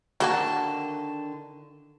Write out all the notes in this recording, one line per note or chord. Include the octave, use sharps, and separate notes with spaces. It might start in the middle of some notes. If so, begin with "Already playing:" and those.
D3 D#3 F#3 A#3 F#4 A5